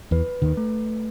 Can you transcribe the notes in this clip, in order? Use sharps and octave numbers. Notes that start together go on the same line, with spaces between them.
E2 E3 B4
D#2 D#3
A3